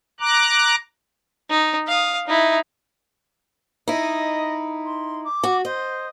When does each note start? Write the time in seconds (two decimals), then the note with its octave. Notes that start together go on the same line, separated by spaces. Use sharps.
0.20 A#5 D6 F#6
1.50 D#4
1.87 F5 D#6
2.27 D#4 E4
3.88 D#4 E4 D#5
4.85 C6
5.24 D6
5.44 F#4
5.65 C5 D#5